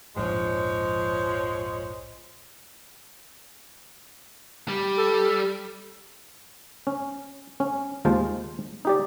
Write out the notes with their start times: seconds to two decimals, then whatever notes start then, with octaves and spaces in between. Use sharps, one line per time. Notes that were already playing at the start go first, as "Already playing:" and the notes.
0.16 A#1 F2 G#2 F3 G#3 C#5
4.68 G3
4.97 A4
6.87 C#4
7.60 C#4
8.05 D#2 G#3 F4 C5 A5
8.85 D#4 G4 D5